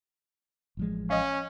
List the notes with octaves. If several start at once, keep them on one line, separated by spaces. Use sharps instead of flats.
A1 F3 G#3
C#4 D#5 F5